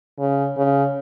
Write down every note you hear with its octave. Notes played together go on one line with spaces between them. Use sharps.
C#3
C#3